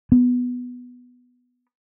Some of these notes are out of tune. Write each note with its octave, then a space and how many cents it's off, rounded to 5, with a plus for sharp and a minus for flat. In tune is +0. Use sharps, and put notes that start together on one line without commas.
B3 +0